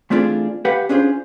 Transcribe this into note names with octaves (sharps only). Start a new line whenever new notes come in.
E3 A3 C4 D4 F4 G#4
G4 B4 F5 F#5
C#4 D4 F4 G#4 C5